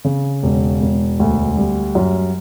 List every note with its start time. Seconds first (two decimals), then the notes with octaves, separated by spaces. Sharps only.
0.05 C#3
0.43 E1
0.81 E1
1.20 D2
1.57 G3
1.95 F#2